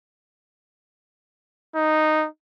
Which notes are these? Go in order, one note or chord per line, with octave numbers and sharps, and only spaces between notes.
D#4